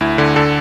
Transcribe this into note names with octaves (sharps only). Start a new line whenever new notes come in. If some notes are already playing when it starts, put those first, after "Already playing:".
D2 E4
D3
D3 A4